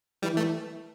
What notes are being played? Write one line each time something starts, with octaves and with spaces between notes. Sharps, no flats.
E3 G3
E3 A3